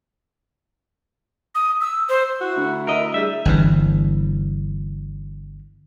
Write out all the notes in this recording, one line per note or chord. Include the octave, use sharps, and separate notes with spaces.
D#6
E6
C5
E4 F#4
D2
A#4 D#5 E5
G3 G#4 E5
G1 G2 E3